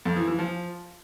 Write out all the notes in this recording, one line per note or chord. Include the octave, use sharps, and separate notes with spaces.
F2
E3
E3
F3